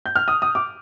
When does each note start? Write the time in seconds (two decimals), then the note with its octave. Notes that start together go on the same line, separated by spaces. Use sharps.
0.06 G6
0.16 F6
0.28 D#6
0.42 D#6
0.55 D6